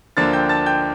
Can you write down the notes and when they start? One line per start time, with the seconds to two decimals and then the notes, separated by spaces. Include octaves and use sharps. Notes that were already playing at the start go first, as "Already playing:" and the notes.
0.17 D2 D3 F3 A#3 D4 A5 A6
0.33 G5 G6
0.49 A5 A6
0.66 G5 G6